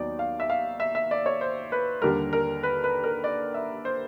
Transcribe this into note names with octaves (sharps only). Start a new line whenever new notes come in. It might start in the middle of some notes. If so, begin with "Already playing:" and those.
Already playing: D#2 D#3 F#3 B3 D#4 D5
F5
E5
F5
E5
E5
D5
C#5
C5
B4
D#2 D3 G3 A#4
A#4
B4
B4
A#4
D5
E5
C5